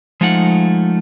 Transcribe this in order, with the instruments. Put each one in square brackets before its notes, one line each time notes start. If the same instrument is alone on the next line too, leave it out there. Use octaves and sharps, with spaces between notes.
[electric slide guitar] F3 G#3 A3 D#4 F4 F#5